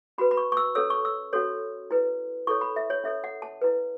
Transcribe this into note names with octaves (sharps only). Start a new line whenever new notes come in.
C#4 F#4 B4 B5
B5
C#6
C#6
E6
C#4 A4 C#5 E6
C#6
E6
C#4 F#4 A4 C#5
E4 B4
E4 A4 C#5 C#6
B5
E5
C#5
C#4 A4 C#5 E5
F#5
A5
E4 B4